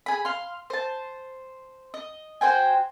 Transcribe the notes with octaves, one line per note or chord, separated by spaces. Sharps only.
G#4 B5
F5 C6
C5 A5
D#5
F#4 C5 G5 G#5